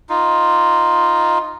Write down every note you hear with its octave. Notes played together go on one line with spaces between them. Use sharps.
D#4 F4